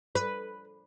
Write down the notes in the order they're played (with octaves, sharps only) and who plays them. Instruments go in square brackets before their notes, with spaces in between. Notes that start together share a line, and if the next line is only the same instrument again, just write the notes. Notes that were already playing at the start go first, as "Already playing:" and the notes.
[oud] B4